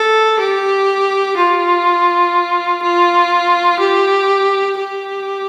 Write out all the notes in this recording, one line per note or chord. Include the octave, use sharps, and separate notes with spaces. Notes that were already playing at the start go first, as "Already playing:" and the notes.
Already playing: A4
G4
F4
F4
G4
G4